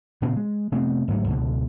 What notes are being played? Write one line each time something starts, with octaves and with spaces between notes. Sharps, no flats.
A#2 C#3 B3 C4
G#3
C3 A3 B3 C4
G1 G#2 F#3 A3
C#2 B2 D3